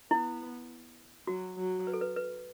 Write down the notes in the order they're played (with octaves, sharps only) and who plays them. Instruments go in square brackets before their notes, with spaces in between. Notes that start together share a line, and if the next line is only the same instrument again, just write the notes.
[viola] B3 [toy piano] E4
[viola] F#3 [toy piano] F#4
[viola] F#3
[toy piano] B4
A4
B4
B4